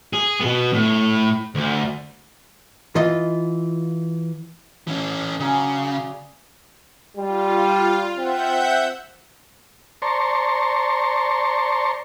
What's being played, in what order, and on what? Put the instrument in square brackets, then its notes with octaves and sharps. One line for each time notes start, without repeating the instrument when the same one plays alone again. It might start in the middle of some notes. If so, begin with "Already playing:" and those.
[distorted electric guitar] G#4
B2 B3
A2
D2
[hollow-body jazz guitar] E3 F4 D#5
[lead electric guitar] E3 C#4
[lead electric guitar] C#3 [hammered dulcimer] F#3 G#4 D5
[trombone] G3 [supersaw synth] F4
[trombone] C4 [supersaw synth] E5 F#5 G6
[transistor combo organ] C5 D5 A5 A#5 C6 C#6